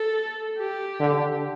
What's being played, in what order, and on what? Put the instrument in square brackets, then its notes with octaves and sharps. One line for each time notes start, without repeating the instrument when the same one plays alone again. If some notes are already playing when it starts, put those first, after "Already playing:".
Already playing: [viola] A4
G4
[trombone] D3